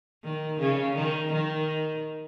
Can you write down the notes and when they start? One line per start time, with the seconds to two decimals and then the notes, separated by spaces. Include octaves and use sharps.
0.24 D#3
0.60 C#3
0.96 D#3
1.33 D#3